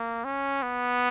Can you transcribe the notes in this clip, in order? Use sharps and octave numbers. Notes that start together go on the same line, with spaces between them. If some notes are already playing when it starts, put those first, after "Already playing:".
Already playing: A#3
C#4
B3